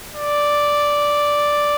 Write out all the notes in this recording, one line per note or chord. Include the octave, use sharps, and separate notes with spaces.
D5